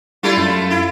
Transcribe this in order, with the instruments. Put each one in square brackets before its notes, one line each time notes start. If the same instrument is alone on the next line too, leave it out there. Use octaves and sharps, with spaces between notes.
[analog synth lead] G3 [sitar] A3 E4 F4
[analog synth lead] F#2
[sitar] E4